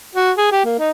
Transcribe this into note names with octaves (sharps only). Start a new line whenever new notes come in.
F#4
G#4
G4
A#3
D#4